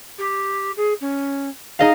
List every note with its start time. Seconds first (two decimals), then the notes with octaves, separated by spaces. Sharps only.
0.18 G4
0.76 G#4
1.00 C#4
1.79 D#4 G#4 D#5 F5